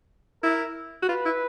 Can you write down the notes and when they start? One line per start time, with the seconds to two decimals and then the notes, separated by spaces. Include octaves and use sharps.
0.42 E4 A#4
1.02 F#4
1.08 F4 B4
1.25 E4